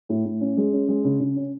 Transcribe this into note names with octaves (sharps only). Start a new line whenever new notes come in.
A2
A2
C#4
G#3
C#4
G#3
C#3
C#3
C#4